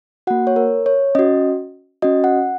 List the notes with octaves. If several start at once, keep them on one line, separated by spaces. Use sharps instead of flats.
A#3 F#4 F#5
C#5
A#4
C#5
C#4 F#4 D#5
C#4 F#4 D#5
F#5